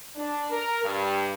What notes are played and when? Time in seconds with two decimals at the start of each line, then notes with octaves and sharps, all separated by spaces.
0.16 D4
0.51 A#4
0.83 G2